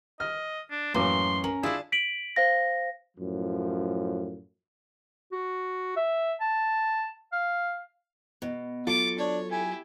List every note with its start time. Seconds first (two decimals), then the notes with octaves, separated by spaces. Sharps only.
0.20 D#5 F6
0.70 D4
0.94 F#2 A2 E3 F#3 A#3 C#4 C6 D6
1.44 C#4 A#4 F#7
1.63 D4 E4 F4 G#4 D5 A5
1.92 B6 D7 F#7
2.36 C5 F5 A#6
3.17 F#2 A2 F3
5.32 F#4
5.97 E5
6.40 A5
7.33 F5
8.42 B2
8.87 F#3 F4 A4 D6
9.19 D4 C#5
9.51 E4 G4 G#5